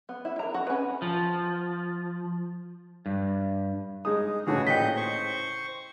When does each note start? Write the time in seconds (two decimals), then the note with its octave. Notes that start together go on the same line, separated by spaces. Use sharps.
0.09 B3
0.25 E4
0.39 A#4 A#5
0.54 F#4
0.67 C#4 B4
1.02 F3
3.06 G2
4.05 G#3 D#4 G#4 D#6
4.47 A2 C#3 E3 F#4 G#4
4.67 A#2 D#5 G5 G6 B6
4.97 C5 C#6